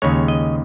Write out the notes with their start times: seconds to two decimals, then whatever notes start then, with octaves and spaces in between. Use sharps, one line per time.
0.02 D#2 C#3 G#3 C#5
0.28 D#5